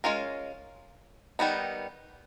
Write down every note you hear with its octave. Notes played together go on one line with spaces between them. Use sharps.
G#3 C#4 F4 A#4
D#3 G3 B3 D#4